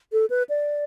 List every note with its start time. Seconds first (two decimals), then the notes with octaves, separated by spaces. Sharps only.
0.13 A4
0.30 B4
0.49 D5